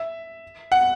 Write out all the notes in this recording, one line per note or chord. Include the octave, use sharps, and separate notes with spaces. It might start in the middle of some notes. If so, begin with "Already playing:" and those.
Already playing: E5
F#5